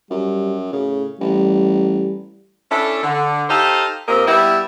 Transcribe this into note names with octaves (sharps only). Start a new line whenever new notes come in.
F#2 G3
A2 C#3
A1 G3
C#4 D4 E4 A4
D3
D#4 G4 A4 C5 D#5 F5
A#2 A#3 C4 G4 A#4 D#5
G3 B3 E4